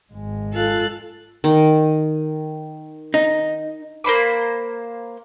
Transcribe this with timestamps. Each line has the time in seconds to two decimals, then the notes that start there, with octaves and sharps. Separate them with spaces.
0.13 G#1 G#3
0.54 F4 A4 F5 F#6
1.44 D#3
3.14 D#4
4.04 A#3 C5 B5 D6